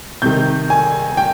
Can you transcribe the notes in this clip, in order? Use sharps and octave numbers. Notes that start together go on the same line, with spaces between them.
C3 D#3 G6
G#5
G5